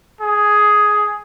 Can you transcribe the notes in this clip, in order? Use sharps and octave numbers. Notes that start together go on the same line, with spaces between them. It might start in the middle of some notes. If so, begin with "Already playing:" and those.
G#4